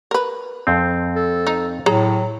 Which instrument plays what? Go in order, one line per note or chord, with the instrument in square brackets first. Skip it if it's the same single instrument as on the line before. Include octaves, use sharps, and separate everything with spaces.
[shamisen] A#4 B4
[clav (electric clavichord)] F2 C4
[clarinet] A4
[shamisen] D#4
[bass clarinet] A2 [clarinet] F#3 [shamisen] G#4 A#5